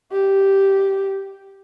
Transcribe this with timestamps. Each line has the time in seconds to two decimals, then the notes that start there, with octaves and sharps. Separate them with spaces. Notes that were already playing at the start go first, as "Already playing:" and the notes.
0.12 G4